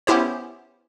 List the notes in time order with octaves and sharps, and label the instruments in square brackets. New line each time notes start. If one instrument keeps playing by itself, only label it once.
[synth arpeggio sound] B3 C#4 E4 G4 C5